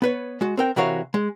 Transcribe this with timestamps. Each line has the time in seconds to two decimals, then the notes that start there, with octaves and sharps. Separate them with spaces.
0.02 B3 B4 C#5
0.41 G#3 F#4
0.57 C4 A#4 G5
0.76 C3 E3 F#4 A#4 C#5 F5
1.14 G#3